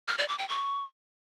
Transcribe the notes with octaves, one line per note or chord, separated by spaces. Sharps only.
F6
D5
D6
G5
C#6